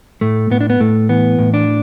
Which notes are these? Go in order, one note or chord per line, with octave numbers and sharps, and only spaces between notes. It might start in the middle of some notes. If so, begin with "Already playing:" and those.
A2 A3
A2 B3
D4
B3
A2 A3
E3 B3
A2
D4